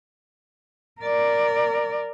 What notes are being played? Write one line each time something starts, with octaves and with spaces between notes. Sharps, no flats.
A#4 D5